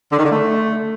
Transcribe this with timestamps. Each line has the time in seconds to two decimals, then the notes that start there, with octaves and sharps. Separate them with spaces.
0.11 D3
0.18 D#3
0.25 D3
0.31 A3